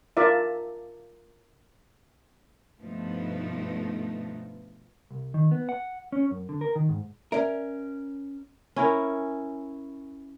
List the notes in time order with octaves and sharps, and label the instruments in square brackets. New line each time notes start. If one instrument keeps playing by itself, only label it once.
[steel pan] F4 A#4 D5 E5
[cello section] G2 B2 F3 A3 B3 D#4
[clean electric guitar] C2
D#3
B3
F#5
C#4
F#2
D3
A#4
D#3
G#2
[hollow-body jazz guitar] C#4 A#4 [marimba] D5 E5
[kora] C#4 E4 A#4